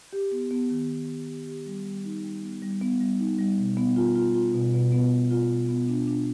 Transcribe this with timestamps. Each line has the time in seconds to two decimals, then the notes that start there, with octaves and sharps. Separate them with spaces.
0.13 G4
0.32 B3
0.51 B3
0.70 D#3
0.89 B3
1.09 G4
1.28 G4
1.47 G4
1.66 G3
1.85 G3
2.05 D#4
2.24 G3
2.43 B3
2.62 G3
2.81 B3
3.01 G3
3.20 D#4
3.39 G3
3.58 B2
3.77 B3
3.96 F4
4.15 F4
4.35 F4
4.54 B2
4.73 B2
4.92 B3
5.12 B2
5.31 F4
5.50 B2
5.69 B3
5.88 D4
6.07 D4